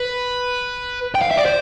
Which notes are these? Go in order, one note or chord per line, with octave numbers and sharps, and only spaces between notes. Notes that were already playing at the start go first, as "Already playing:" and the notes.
Already playing: B4
G5
F5
E5
D5
C5